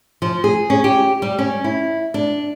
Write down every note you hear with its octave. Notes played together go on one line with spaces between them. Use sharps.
F3
G#4
C#4
G4
G3
C#4
E4
D4